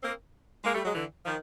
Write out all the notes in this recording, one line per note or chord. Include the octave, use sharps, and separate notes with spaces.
A#3 C4
G#3 A#3
G3 A3
F#3 G#3
D3 E3
D#3 F3